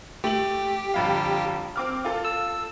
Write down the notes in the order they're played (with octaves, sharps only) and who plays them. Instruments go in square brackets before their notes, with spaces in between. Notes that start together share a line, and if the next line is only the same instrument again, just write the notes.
[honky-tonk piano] A3 F#7 [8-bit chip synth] G4
[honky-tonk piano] G1 F2 F5
C4 D6 F6
F4 A4
[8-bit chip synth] E6